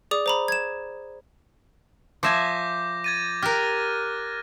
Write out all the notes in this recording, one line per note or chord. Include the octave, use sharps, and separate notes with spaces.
G#4 D5 D6 D#6
C5 A#5 B5
G#6 E7
F3 E5 G#5 D6 G6 A#6
G#6 A6 D#7
G4 A#4 F6 F#6 A#6